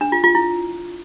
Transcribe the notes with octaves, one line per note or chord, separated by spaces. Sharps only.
D4
F4
F4
E4